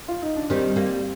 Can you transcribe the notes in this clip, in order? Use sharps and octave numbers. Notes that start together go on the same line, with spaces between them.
F4
D#4
D4
D#3 G3 C4
G3 A#3